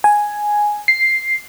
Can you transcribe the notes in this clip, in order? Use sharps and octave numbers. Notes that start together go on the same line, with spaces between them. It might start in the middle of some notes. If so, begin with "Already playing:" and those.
G#5
C7